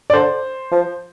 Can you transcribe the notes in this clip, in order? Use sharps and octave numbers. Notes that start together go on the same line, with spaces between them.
D5
D3 C5
F3